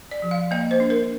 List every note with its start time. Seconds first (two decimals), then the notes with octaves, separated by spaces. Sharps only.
0.11 D5
0.22 F3
0.31 F5
0.51 A#3 D#5
0.71 C5
0.80 D4
0.90 A#4